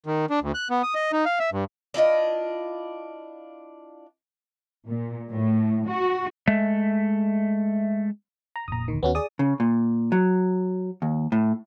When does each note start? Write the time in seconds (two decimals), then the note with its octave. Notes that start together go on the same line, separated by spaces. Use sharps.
0.06 D#3
0.30 D4
0.42 D2
0.54 F#6
0.70 B3
0.83 D#6
0.95 D#5
1.12 D#4
1.25 F5
1.39 E5
1.52 G2
1.94 D4 E4 F4 D#5
4.87 A#2
5.31 A2
5.88 F#4
6.47 G#3 A3 E5
8.56 A#5
8.68 F1 A#2 A#5 D#6
8.88 D2 D#3
9.03 D#2 B3 C#4 F#4
9.15 G#4 D5 D#6
9.39 C#3
9.60 A#2
10.12 F#3
11.02 D#2
11.32 A2